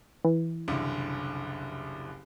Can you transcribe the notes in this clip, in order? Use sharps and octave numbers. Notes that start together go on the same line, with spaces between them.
E3
F#1 C2 D3